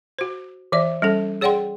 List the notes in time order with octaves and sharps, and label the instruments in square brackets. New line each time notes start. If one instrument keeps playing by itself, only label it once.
[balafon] F#4 C5
E3 D5 E5
G3 C#4 A4
G#4 C#5 D5 F#5 G5 C6